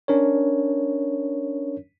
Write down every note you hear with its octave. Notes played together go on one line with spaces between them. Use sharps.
C#4 D4 A#4 C#5